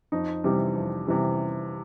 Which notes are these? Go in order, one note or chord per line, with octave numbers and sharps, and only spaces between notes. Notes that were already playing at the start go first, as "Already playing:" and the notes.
F2 D#4
C3 E3 G3
F2
C3 E3 G3